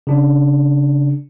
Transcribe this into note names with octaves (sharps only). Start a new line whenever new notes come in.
C#3 D4